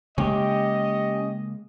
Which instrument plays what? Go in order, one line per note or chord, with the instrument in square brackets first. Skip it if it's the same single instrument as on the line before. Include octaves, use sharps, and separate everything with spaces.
[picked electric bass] C#3 G#3 A#3 [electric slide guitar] C#4 G4 [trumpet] D#5